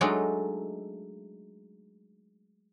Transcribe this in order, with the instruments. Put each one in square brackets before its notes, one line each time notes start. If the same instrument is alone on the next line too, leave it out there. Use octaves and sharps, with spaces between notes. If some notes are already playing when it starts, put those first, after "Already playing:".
[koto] F#3 G#3 A3 D4 D#4